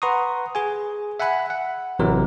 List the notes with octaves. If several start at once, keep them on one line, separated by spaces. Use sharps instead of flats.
B4 F#5 A#5 C6 C#6 D#6
G#4 G#5
E5 F#5 G#5 B5 F#6
F#5
A1 C3 E3 F#3 A#4